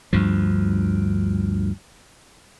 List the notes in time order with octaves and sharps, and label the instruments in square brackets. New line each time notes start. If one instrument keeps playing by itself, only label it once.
[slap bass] D2 G2 F3